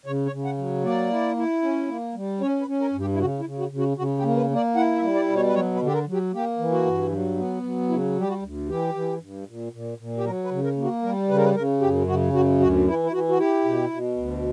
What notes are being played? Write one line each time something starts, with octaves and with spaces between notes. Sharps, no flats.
C#3 C#5
C#5
C#3
F#5
F#3
A#3 D5
E4
E4
C#4
A#3
G3
C#4 C#5
B4
C#4
A#4
G2
G4
E4
C#3 F#4
E4
C#3
F#4
C#3
F#4
C#3 F#4
G4
A#3
B4
A#3
D5
E4 F#5
E5
G3
D5
B2
C#5
B4
F#3 C#5
B4
D3
G4
A#4
F#3
G4
A#3 G4
E3
F#4
G2
F#3
B3
F#3
C#3 E4
G3 G4
F#4
D2
E3 G4
E3
G2
A#2
A#2
A#2
G4
F#3 A#4
B4
C#3
A#4
A#3
F#4
G3 A#4
C#3 B4
A#4
B4
C#3 A#4
F#2 G4
C#3 F#4
F#2 F#4
D2 F#4
E3 E4
E4
E3 F#4
F#4
E4 G4
B2
B2
D2